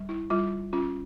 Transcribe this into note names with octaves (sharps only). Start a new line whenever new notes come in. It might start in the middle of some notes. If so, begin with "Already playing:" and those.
Already playing: G3
E4
G3 F4
C#4 F4